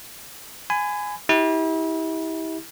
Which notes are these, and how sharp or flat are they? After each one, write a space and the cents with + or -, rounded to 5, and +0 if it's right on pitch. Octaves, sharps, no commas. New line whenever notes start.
G#5 +0 B5 +35
E4 -35 G4 +0